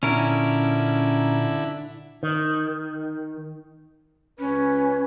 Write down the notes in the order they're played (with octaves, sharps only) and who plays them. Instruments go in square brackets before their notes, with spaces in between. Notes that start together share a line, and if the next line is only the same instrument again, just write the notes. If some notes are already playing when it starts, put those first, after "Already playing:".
[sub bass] A#2 [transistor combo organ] D3 E4 [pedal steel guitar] C#4 A#4
[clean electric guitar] D#3
[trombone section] C#2 B4 [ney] C#4